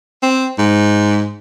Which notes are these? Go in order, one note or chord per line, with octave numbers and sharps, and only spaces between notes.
C4
G#2